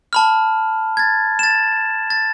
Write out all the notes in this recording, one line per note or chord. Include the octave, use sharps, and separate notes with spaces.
A5 B5 F6
G#6 A6
A6 E7
A6